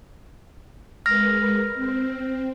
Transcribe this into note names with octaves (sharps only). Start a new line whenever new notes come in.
G#3 A#4 B4 F6 A#6
C4